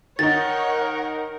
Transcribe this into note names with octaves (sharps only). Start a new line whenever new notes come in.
D#3 D#4 A#4 C#5 F#5 A6